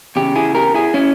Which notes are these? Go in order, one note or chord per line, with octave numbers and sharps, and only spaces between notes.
E2 C#3 G4
E4 G#4
G4 A#4
E4 G#4
C#4 E4